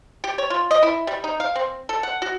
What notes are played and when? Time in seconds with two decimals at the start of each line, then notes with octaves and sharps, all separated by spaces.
0.24 G4
0.38 C#5
0.50 F4
0.71 D#5
0.83 E4
1.07 G3
1.24 D#4
1.40 F5
1.55 C4
1.89 A4
2.03 F#5
2.22 F#4